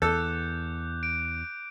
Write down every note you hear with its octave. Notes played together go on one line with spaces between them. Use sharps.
E2 A4 D6 F#6 G6
D7